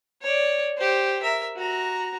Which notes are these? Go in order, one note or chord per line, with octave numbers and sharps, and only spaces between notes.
C#5 D5
G4 C5
A#4 E5
F#4 A#5